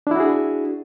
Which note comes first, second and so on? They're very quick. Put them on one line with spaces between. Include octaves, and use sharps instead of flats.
D4 E4 F#4 G#4